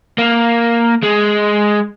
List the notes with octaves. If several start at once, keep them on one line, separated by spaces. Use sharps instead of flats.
A#3
G#3